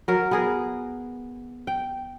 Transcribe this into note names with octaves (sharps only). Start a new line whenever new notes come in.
F#3 A#4
B3 G#4 A#4
G5